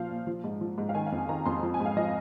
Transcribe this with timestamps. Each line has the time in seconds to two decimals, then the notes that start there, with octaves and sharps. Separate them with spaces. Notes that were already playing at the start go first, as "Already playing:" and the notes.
Already playing: A#2 F3 C5 F5
0.10 A#2
0.27 F3
0.44 G#2
0.61 F3
0.78 G#2
0.89 F5
0.95 D#3 G#5
1.07 F5
1.12 F2
1.18 G#5
1.29 D#3 A#5
1.46 F2 C6
1.63 F3
1.74 G#5
1.80 G#2
1.86 F5
1.97 F3 D#5